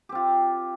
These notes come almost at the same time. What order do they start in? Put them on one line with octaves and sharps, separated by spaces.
G4 C4 F4